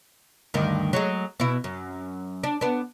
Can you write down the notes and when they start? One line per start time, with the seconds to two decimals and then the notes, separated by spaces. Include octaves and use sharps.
0.54 D2 G2 D#3
0.93 F#3 G#3 G#4
1.40 B2 E4
1.64 F#2
2.43 D4
2.61 B3 D4